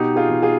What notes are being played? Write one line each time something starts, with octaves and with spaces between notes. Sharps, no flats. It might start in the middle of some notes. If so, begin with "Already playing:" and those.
Already playing: B2 D#4 G4
F4 G#4
B2
F4 G#4